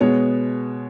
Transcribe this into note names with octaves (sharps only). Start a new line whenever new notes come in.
B2 G#3 B3 C#5